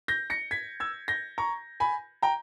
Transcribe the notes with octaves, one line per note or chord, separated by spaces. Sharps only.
G6 A#6
A#6 C#7
G#6 B6
E6 G#6
G6 A#6
A#5 C#6
G#5 B5
G5 A#5